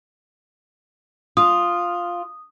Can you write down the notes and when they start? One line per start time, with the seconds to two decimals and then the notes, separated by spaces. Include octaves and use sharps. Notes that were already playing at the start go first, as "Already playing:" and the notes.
1.37 F4 D#6